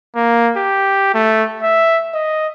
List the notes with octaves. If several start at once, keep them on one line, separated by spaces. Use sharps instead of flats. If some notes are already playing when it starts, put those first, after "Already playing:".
A#3
G4
A3
E5
D#5